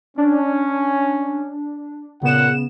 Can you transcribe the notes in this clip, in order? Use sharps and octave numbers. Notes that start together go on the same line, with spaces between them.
C#4 D4
A#2 C#3 B3 F#5 E7